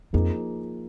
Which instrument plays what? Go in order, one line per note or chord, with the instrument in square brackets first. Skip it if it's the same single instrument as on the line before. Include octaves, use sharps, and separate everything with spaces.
[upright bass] F2 [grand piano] F3 A#3 D#4 G#4